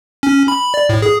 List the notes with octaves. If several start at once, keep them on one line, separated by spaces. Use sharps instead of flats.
C#4
B5
D5
A2
G#4